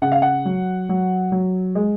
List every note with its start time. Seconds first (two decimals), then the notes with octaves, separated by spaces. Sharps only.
0.02 C#3 F#5
0.12 F5
0.22 F#5
0.45 F#3
0.89 F#3
1.32 F#3
1.75 G#3